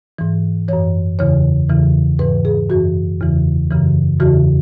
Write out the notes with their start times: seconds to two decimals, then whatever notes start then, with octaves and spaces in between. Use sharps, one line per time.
0.19 G#2 E3
0.68 F#2 E3 C#5
1.19 E2 C#3 E3 C#5
1.69 E2 C#3 E3
2.19 G#2 E3 B4
2.45 G#4
2.70 F#2 E3 F#4
3.20 E2 C#3 E3
3.70 F#2 C#3 E3
4.20 E2 C#3 E3 F#4